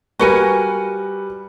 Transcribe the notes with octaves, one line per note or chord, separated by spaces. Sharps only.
G3 F#4 A#4 B4 G#5 C#7